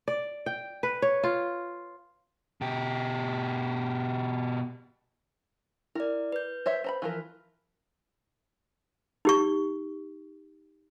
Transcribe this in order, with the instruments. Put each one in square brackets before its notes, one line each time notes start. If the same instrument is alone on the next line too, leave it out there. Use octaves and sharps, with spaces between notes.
[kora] D5
G5
B4
C#5
F4
[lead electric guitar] B2 G4
[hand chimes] E4 D5 [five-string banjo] A#4
[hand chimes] B4 G6
[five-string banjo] C5 C#5 E5
C5 A#5 B5
E3 F3 A#4
[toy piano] D#4 G4 C#6